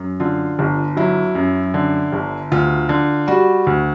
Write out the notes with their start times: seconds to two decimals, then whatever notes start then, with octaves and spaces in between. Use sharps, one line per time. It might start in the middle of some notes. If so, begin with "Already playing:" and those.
Already playing: F#2
0.20 D3 F4
0.59 G1
0.97 F#3 E4
1.35 F#2
1.74 D3
2.12 G1
2.52 D2 F4
2.89 D3
3.28 G3 F#4
3.67 D2